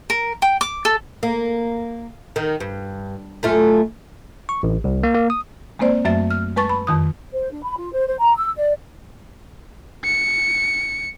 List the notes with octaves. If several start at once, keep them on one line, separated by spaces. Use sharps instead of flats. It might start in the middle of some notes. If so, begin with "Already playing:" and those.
A#4
G5
D6
A4
A#3
D#3
G2
F#2 A3 F4
C#6
A1
C2
A#3
A#3
D#6
G#3 A#3 C4 C5 D5
F#2 F#3 A3 E5 A6
F6
G#3 B4 A5 C#6 A6
B5
F2 D#3 D#6
C5
D4
B5
F4
C5
C5
A#5
E6
D5
C#7